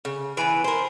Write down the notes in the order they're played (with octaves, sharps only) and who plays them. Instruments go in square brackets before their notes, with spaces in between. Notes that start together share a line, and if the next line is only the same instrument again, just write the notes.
[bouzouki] C#3
[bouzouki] E3 B3 [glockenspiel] G#5 B5 D7
[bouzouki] A#4 C5